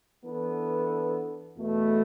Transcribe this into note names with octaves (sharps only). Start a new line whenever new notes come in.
E3 B3 D4 A4
E2 B2 A3